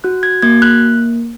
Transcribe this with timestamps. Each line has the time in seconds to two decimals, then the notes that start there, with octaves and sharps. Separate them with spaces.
0.04 F#4 F#6
0.23 G#6
0.42 A#3 G#6
0.62 F#6